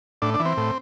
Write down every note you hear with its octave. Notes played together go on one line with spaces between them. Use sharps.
A2 D4
D4
E3
C4
A2